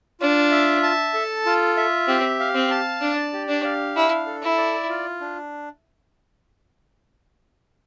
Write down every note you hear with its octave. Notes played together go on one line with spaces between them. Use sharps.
D4 F4
E5
A5
A4
F4
E5
C4 G4
F5
C4
A5
D4 D5
G4
D4
F5
D4 E4
A4
E4
D5
F4
D4